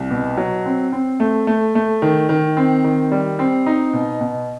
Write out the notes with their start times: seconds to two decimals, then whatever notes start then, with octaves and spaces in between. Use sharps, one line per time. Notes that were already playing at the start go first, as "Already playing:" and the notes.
Already playing: C2
0.11 B2
0.37 F#3
0.66 C4
0.92 C4
1.20 A3
1.47 A3
1.75 A3
2.02 D#3
2.29 D#3
2.57 C4
2.84 D#3
3.11 G3
3.39 C4
3.66 D#4
3.93 B2
4.21 B2